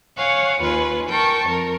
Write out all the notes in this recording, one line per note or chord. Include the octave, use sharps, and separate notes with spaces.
C#5 F5 F#5 G#5
D#2 F4 B4 G#5
A#4 G5 A5 C#6
F2 A#4